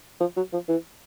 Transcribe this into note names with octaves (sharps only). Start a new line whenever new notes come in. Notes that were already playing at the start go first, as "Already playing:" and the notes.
F3
F#3
F3
E3